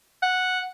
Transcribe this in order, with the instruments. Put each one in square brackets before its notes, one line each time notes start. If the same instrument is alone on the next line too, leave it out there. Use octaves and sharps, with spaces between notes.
[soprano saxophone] F#5